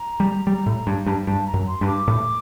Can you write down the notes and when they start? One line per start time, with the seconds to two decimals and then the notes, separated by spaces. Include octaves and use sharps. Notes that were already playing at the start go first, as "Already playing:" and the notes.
Already playing: A#5
0.20 G3
0.47 G3
0.66 A2
0.87 G2
1.06 G2
1.27 G2 A5
1.47 A#5
1.54 F#2
1.67 C6
1.81 G2
1.87 D6
2.08 A2